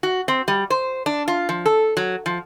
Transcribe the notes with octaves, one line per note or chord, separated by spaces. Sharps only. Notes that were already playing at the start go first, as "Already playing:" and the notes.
F#4
C4
G3
C5
D4
F4
F3
A4
F#3
F3